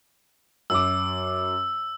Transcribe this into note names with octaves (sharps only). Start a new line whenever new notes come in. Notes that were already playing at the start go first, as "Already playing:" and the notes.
F#2 D6 E6